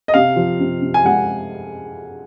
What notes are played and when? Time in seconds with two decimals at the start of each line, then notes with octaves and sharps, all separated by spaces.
0.08 D#5
0.14 C3 F5
0.36 F3
0.60 C3
0.82 C3
0.94 G#5
1.05 G#3 F#5